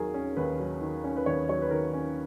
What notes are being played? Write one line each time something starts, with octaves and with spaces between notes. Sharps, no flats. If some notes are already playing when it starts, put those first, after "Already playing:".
Already playing: D#2 D#3 F#3 G#4 A#4
C#4
D#2 B4
F#3
D#3
C#4
B4
D#2 C#5
F#3 C#5
B4
D#3 A#4
C#4